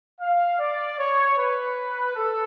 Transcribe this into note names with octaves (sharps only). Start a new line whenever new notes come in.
F5
D5
C#5
B4
A4